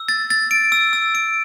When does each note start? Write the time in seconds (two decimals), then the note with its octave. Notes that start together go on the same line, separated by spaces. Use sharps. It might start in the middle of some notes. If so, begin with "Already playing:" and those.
Already playing: E6
0.09 A6
0.30 A6
0.51 D7
0.72 E6
0.93 E6
1.15 D7